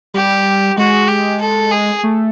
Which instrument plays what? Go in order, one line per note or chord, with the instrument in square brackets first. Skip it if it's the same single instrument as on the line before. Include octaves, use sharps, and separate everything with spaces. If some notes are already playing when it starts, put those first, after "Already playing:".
[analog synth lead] G3 [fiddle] G4
[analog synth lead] G#3 [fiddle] F#4
[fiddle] G4
A4
G#4
[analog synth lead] A3